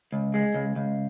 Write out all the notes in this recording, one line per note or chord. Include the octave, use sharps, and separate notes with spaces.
C#2
G#3
C#2
C#2